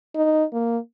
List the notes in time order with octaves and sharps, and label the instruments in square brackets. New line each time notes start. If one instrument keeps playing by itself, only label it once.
[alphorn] D#4
A#3